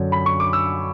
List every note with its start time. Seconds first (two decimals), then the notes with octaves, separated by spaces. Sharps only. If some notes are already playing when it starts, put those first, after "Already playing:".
Already playing: F#2 D3 F#3
0.12 B5
0.26 C#6
0.40 D6
0.53 E6